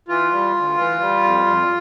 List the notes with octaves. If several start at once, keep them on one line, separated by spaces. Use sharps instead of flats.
E3 F4
G3
D2
E3
G3
F2
F2